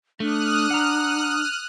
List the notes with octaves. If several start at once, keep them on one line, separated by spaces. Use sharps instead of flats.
A3 D4 D#6 F6 F#6
F#5 A#5